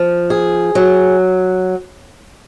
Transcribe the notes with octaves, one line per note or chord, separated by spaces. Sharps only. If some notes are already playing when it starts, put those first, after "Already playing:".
Already playing: F3
G#4
F#3